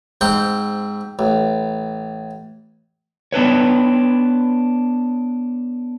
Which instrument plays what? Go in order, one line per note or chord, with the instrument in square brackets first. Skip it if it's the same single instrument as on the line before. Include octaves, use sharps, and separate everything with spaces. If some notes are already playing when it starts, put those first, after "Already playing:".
[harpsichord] G#2 C4 F#5 G5
A1
[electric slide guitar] B3 D4 B4 C#5